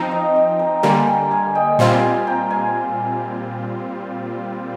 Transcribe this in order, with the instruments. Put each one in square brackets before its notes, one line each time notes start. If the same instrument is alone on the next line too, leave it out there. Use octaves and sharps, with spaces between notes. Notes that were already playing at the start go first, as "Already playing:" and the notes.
Already playing: [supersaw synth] F3 C4 D#4 [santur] A#5
[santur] D#5 G5
D#5 G5
G5 A#5
[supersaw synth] D3 G3 A#3 [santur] G#5 C6
[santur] G5 A#5
F5 G#5
D#5 G5
[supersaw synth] A#2 G3 C4 F4 [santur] G#5 C6
[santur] G5 A#5
F5 G#5